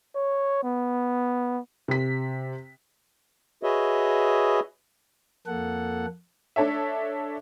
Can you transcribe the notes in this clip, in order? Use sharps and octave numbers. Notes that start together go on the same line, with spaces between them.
C#5
B3
C3 B6
F#4 G#4 B4 C#5 D#5 E5
F2 A#3 A4 F#5
D4 A4 C#5 E5